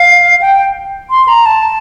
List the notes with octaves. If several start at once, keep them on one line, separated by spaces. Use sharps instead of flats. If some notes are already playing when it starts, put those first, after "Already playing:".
Already playing: F5
G5
C6
A#5
A5